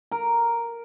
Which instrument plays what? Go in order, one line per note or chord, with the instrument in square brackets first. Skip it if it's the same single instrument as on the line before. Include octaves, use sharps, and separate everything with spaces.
[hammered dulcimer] A#4